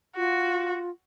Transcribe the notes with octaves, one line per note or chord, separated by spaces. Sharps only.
F4 F#4